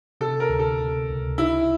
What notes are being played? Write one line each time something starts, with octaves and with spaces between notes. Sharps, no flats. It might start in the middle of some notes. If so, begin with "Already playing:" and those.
C3 A4
A#4
D2
A4
C3
C#2
D#4 E4